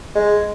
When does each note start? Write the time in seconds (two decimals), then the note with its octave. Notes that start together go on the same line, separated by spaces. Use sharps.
0.15 G#3